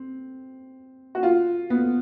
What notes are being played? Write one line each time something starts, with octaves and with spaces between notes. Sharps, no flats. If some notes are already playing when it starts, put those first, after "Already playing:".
Already playing: C4
F#4
F4
B3